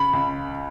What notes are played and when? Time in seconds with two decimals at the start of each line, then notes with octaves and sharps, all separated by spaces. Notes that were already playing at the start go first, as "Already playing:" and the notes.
Already playing: C#3 B5
0.13 C#2